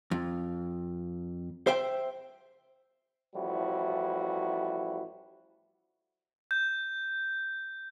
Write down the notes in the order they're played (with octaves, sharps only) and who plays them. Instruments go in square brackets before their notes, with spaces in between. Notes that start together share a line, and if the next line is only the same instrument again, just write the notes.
[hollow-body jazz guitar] F2
C5 E5 G5
[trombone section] A1 F3 G3 E4 F#4
[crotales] G6